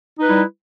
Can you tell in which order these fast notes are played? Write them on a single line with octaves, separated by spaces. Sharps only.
D#4 B4 E4 G3